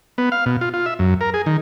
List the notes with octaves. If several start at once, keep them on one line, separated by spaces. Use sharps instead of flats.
B3
F5
B2
F4
F4
E5
F#2
A#4
G#4
D#3